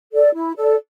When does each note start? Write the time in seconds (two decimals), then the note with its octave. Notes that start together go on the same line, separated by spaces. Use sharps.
0.12 A4 D5
0.34 E4
0.57 A4 D5